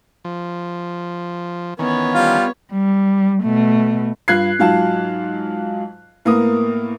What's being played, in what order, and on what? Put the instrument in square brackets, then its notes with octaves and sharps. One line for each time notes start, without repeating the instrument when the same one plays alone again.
[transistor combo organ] F3
[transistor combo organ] D#3 E3 C#4 [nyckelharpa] B3 C#5
[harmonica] G3 F4 F5
[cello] G3
B2 A3
[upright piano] G2 F4 F#6 G#6 C7
G#2 F#3 F4 F5 A5
A2 A#3 B3 A#4 D#6